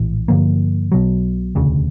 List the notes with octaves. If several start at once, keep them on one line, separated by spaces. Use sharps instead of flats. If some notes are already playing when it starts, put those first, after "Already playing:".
Already playing: A#1 A2 E3
G2 D3 F3 A#3
B1 B2 F#3
E1 D2 C#3